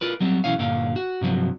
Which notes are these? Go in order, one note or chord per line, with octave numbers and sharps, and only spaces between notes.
F4 A#4 B4
F#3 G3 C4
B1 G2 E3 C#4 F5
G2 A#2 D3 F5
F#4
G2 C3 F3 F#3